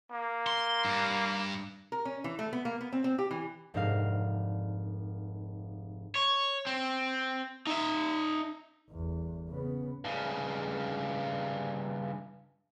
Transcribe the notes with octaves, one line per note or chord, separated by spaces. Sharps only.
A#3
C6
G2
A#4
C#4
E3
A3
B3
A#3
B3
C4
C4
G4
E3
F1 G#2 D4 A#4 F5
C#5
C4
D#4 E5
G1 E2
C#3 B3
G2 C#3